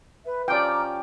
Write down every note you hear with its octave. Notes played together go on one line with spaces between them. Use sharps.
B4 E5
F3 C#4 G4 D5 G5 A#5 D6 F6